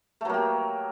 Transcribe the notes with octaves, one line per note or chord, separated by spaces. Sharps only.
F#3 A3 A#3 G4